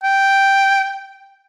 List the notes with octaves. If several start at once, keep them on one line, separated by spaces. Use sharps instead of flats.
G5